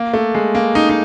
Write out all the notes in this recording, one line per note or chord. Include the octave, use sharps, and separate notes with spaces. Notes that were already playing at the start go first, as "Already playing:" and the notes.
Already playing: A#3
A3
G#3
A#3
D#4
D#4